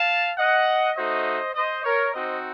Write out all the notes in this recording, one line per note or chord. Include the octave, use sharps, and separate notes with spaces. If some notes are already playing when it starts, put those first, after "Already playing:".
Already playing: F5 A5
D#5 F#5
A3 D#4 F#4 C5 D#5
C5 D#5
A#4 C#5
C4 D#4 F#4 C5 D#5